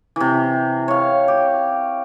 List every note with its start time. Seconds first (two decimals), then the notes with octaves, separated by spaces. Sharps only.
0.16 C3 E3
0.88 C#5 F5
1.28 G4